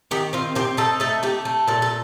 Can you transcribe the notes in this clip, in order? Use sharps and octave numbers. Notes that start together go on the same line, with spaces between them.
D#3 G4
C4 F4
C4 G4
D#4 A4
A3 A4
A3 G4
A3
A#2 A4
A4